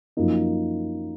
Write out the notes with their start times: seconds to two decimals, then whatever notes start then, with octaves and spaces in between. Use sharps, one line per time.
0.17 F#2 F3 A#3 D#4